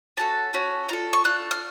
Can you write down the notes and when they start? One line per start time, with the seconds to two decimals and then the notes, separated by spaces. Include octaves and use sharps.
0.17 C#4 F#4 A4 A5
0.53 C#4 F#4 A4
0.88 D4 F4 A4 A#5
1.13 C#6
1.24 D4 F4 A4 F#6
1.51 F6